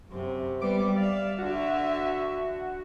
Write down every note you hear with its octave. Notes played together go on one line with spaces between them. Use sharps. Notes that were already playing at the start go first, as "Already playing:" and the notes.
F#2 C3
G3 B3 D6
D5 E5 F5
D3 F#4 E5